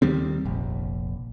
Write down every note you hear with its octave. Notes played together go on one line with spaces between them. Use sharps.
D#2 D#3 G3 C4
F1 A#1